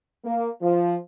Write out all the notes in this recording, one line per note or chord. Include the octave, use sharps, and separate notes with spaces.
A#3
F3